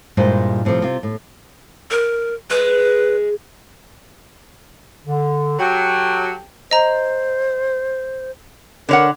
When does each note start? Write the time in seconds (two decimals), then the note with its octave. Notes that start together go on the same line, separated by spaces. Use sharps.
0.17 G2 A#2 G#3 E4 C5
0.65 A2 C3 E3 F3
0.82 C3 F4
1.03 A2
1.91 A#4
2.50 G#3 B4
5.06 D3
5.59 F#3 G4 A4 G5
6.71 C5 D#5 A#5
8.89 D3 A#4 C#5 F#5